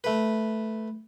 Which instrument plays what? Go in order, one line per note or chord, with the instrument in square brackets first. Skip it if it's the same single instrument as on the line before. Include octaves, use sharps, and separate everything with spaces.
[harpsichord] A3 B4